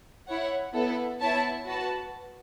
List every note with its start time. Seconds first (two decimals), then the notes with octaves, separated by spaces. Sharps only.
0.27 E4 C#5 F#5
0.73 B3 E4 A4
1.20 B3 E4 C#5 E5 A5
1.66 F#4 B4 A5